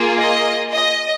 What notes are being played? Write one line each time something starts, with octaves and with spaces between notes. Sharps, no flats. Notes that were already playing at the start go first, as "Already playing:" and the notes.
Already playing: A#3 F4 G#4
D#5
D#5